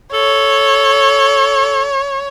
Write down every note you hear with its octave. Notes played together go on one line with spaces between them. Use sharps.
A4 C#5